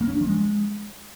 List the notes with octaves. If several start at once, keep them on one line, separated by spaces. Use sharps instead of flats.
A#3
C#4
D4
F3
G#3